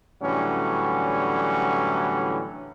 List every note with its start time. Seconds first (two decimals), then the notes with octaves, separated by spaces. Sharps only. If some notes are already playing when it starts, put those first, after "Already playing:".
0.22 A2 D3 E3 F#3 G3 C#4